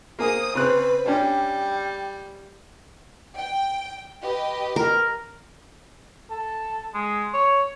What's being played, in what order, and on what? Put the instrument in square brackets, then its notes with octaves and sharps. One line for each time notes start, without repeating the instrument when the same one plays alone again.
[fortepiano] A#3 G#4 [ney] C5 [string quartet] D#6
[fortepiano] C#3 C4 F#6 [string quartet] B4
[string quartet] G3 [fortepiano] C#4 D4 [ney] G5
[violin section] G5
G4 B4 D#5
[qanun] A#4
[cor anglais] A4
G#3
C#5